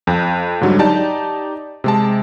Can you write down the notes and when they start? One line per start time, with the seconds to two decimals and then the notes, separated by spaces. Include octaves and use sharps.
0.07 F2
0.61 G#2 D3 F#3 G3
0.79 D#4 G4 D5 A5
1.84 C3 G#3 A5